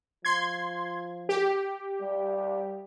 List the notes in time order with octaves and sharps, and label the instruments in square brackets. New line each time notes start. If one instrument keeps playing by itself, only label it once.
[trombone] F3 [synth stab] C6 G#6
[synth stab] G4
[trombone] G3